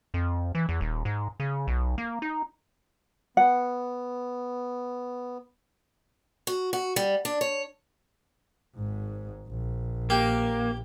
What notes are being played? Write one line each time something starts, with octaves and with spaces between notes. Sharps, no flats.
F2
E3
E2
D#1
G#2
C#3
B1
A#3
D#4
B3 F#5
F#4
F#4
G3
D4
C#5
G#1 G#2
A#1
A#3 G4